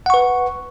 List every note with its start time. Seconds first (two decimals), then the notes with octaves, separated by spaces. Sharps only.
0.06 F#5
0.10 C#6
0.14 B4